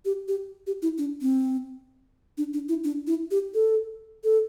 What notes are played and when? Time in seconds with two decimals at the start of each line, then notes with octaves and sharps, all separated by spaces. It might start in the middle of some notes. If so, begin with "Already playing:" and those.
0.05 G4
0.28 G4
0.67 G4
0.82 E4
0.98 D4
1.22 C4
2.38 D4
2.54 D4
2.69 E4
2.84 D4
3.07 E4
3.31 G4
3.54 A4
4.24 A4